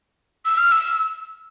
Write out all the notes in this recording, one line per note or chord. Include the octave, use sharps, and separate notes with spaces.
E6
F6
E6